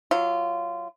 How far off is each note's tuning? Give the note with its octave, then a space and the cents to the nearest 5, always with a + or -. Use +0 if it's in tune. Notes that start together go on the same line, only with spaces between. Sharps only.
F#3 +0 F4 -20